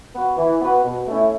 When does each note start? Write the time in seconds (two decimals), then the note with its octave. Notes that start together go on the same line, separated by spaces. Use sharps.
0.14 B3 F#4 B4
0.38 E3
0.62 B3 F#4 B4
0.85 B2
1.08 A3 C#4 E4